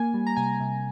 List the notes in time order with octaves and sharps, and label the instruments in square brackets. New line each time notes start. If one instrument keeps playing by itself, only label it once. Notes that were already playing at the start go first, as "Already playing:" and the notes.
Already playing: [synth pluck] A#3 G#5
G3
A#5
C3 G#5
C3